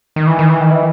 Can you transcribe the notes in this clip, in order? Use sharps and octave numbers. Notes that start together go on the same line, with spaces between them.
D#3
E3
D#3
E3
D#3
E3